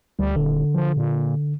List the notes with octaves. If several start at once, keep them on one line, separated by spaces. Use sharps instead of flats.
D2 G3
D#1 D3
F3
A#2